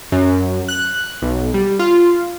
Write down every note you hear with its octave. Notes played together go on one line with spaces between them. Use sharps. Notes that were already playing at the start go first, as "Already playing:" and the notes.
F#2
F#6
B1
G3
F4